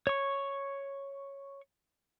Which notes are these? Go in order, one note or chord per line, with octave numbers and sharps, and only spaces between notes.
C#5 C#6